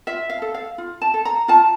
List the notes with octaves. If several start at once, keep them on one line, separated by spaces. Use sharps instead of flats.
F4 E5
F5
A4
F5
F4
A5
A4
A#5
F4 A5